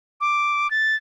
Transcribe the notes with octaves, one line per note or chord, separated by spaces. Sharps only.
D6
A6